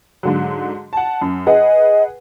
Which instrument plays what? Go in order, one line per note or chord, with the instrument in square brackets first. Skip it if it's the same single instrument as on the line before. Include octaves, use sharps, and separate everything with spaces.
[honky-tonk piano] G#2 D3 F#3
F#5 A5
F#2
[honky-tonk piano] G#4 B4 F#5 [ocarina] D#5